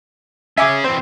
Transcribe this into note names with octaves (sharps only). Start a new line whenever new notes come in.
C#4 G#4 E5 G#5 D6
E3 C4 C5